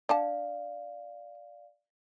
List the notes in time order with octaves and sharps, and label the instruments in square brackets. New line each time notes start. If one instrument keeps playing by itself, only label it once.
[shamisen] D4 F#5 A5 [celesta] D5 F5